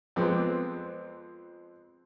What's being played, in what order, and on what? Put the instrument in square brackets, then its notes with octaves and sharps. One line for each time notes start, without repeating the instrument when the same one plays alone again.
[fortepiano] F2 G#3 B3 C4 D6